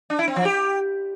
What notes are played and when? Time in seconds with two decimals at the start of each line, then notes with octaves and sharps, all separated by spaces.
0.10 D4
0.19 E4
0.28 C4
0.36 F3
0.45 G4